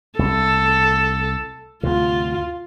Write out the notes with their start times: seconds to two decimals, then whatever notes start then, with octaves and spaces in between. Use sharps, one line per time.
0.19 C2 A4
1.83 D2 G2 C3 F4